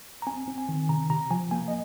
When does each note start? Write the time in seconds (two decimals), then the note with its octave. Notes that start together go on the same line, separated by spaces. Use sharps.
0.22 A#5
0.27 C4 G#5
0.48 C4
0.58 G#5
0.69 D#3
0.89 C3 A#5
1.10 C3 A#5
1.31 F3 G#5
1.51 A#3 G#5
1.68 D#5